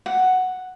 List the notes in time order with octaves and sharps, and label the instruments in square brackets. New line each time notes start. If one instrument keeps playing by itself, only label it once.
[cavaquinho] F#5